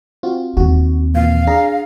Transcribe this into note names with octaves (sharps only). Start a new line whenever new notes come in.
C4 F4 F#4
D#2 C4 F#4
A#2 E3 F5
D4 G#4 A#5